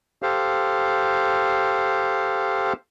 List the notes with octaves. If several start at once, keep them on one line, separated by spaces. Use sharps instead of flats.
G4 A4 C5 F5